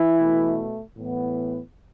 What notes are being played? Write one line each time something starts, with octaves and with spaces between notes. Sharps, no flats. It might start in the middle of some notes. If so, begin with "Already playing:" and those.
Already playing: E3 E4
B2 A3
A2 E3 B3